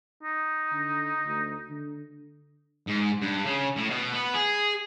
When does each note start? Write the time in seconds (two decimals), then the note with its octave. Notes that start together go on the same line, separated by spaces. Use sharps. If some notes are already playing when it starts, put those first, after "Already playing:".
0.23 D#4
0.72 D3
1.26 D2
1.70 D3
2.87 G#2
3.22 G2
3.45 C#3
3.77 A2
3.91 B2
4.14 B3
4.34 G#4